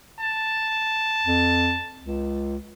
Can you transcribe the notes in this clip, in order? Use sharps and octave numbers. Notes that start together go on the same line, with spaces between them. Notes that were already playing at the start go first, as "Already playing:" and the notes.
A5
F2
C#2